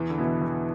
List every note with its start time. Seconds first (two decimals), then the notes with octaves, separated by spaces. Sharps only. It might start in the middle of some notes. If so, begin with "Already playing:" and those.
Already playing: E2 E3
0.10 D3
0.18 B2 B3 E4
0.25 E3
0.42 E2